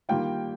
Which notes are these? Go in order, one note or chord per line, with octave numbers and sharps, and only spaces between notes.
D#3 G3 A#3 F4 G5